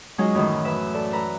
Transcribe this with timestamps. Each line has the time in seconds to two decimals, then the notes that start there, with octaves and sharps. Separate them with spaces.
0.18 F#3 G#3 C#4 D#4 F4 G#4
0.35 F#2 A2 D#3 E3
0.65 B4 E5
0.94 A4 D5
1.13 B4 A#5